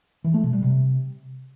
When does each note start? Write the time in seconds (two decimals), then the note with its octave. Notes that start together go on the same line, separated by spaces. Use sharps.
0.24 E3
0.34 A3
0.43 B2
0.53 G3
0.63 C3